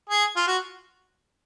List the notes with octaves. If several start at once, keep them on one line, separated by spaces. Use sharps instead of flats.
G#4
F4
F#4